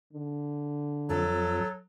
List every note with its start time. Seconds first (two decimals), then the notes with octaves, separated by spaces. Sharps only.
0.13 D3
1.09 F2 F#3 A4